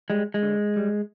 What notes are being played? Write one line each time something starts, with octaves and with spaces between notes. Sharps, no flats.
G3 G#3
G#3
D3
G3